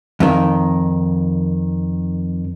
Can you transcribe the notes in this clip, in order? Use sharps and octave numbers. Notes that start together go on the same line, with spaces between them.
F2 D#3